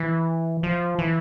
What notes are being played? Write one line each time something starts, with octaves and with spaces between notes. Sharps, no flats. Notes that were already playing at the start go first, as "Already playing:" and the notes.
Already playing: E3
F3
E3